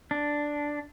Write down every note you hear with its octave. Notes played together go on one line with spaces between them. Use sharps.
D4